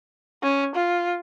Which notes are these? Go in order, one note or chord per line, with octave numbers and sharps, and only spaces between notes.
C#4
F4